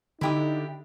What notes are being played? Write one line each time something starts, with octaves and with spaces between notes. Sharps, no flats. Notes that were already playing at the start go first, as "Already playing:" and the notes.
D3 D#4 E4 G4 D#6